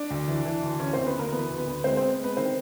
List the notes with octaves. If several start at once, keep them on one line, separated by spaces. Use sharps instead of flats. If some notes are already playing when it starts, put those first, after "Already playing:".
Already playing: D4 D5
D2
E3
E3
D2
E3 C#4 C#5
D2 C4 C5
B3 B4
D2 A#3 A#4
E3 B3 B4
D2
B3 B4
D2
G#3 C4 C5
B3 C4 C5
G#3 B3 B4
D#3 C4 C5